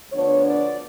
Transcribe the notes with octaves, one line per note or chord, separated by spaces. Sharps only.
D2 D3 F3 B3 D4 C#5
D5